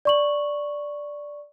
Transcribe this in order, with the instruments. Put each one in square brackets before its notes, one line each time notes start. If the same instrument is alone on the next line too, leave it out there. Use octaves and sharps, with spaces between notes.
[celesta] D5 C#6 F#7